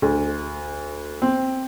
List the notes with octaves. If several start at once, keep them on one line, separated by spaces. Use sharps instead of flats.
D2
C4